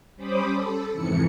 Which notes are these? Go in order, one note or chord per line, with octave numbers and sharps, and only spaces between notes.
G3 C#4 C5 B5 D6 D#6
A4
F2 G#2 C3 E3 C#7